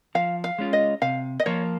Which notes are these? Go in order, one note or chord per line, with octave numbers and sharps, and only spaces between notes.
F3 F5
F5
G#3 C#4 F4
D#5
C3 F5
D#5
F3 A#3 F4 C#5